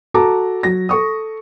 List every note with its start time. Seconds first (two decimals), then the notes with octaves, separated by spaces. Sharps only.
0.14 F#4 A4 A5 A#5 D6
0.63 F#3 A#6
0.89 A4 C#6 D#6